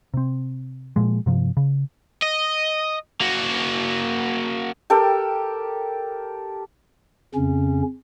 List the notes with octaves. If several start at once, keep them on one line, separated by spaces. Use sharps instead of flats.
C3 C4
A#2 F3 G#3
G2 C3 F3
C#3
D#5
A#3 F#4
G4 A4 A#4 G5
F2 C#3 C#4